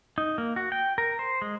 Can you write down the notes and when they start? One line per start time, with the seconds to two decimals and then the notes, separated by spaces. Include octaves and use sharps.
0.18 D#4
0.38 A#3
0.56 F#4
0.72 G5
0.98 A#4
1.19 C5
1.42 G#3